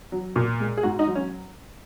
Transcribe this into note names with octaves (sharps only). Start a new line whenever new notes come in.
F#3
A#2
G#3
G#4
G#2 F#4
D#4
F#3
C#4